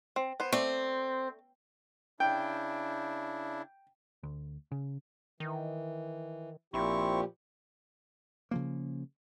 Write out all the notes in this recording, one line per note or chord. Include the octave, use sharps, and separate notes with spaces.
C4
B3 C5
A3 C4 D5
C#3 D4 E4 G5
D2
C#3
D#3 E3
A#1 A#2 F3 C4 E4 G4 C#6
C#3 F3 A#3